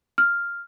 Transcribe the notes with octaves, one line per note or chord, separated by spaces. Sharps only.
F6